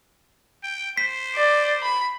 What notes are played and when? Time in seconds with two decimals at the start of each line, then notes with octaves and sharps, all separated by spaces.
0.63 G5
0.97 C5 B6
1.35 D5
1.83 B5